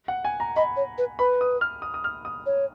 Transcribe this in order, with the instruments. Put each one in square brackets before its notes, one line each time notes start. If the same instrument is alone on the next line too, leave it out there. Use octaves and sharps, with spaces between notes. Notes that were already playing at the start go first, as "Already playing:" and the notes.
[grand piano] F#5
G#5
A#5
[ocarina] D#5 [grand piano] B5
[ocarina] C#5
B4
[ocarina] B4 [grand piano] B5
[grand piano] D#6
F6
D#6
D#6
F6
D#6
[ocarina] C#5